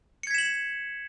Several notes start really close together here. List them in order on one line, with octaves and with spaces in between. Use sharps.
C#7 G#6 B6 E7 F#7